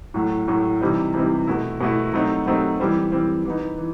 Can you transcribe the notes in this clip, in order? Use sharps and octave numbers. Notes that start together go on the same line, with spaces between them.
A2 F#3 A3
A2 F#3 A3
C3 E3 G3 C4 D#4
C3 E3 G3 C4 D#4
B2 A3 E4
B2 A3 E4
F#3 A3 C4 D#4
F#3 A3 C4 D#4
E3 G3 C4
E3 G3 C4
E3 B3 D#4
E3